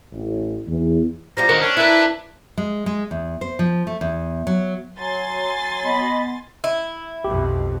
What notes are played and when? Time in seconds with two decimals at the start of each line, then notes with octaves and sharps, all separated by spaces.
0.13 A1
0.68 E2
1.37 F3 G3 F4 A#5
1.49 D#3 F#4 A#4
1.61 C#4 D4
1.77 E4 A#4 B4 E5
2.58 G#3
2.86 G#3
3.11 E2
3.41 C5
3.59 F3
3.87 A3
4.01 E2
4.47 F#3
4.98 F#3 G#5 C6 A6
5.85 B3 D#5 B5
6.64 E4
7.24 B1 F2 B2 G4